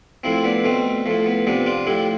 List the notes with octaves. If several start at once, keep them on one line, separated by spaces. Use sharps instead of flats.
A2 F3 C4 E4
B3 D4
B2 A3 C4
A2 F3 A3
B3
C3 F3 B3 D4
D4 F4
A2 F3 E4 G4